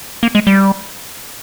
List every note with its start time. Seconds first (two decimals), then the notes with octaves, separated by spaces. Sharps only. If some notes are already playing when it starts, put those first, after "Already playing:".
0.23 A#3
0.35 G#3
0.47 G3